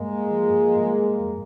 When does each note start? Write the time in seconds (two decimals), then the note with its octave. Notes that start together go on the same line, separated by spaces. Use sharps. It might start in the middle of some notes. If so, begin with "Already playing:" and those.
Already playing: G2 G#3 A#3
0.31 F3
0.76 G2
1.20 F2